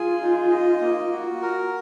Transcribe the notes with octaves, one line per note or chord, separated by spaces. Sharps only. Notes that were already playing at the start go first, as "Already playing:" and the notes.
Already playing: F4 G#4 G#5
D#4
D#5
A#3
F#4
A#4